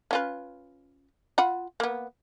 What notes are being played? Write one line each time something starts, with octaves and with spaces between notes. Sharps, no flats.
C#4 F4 B4
F4 F#5 B5
A#3 B3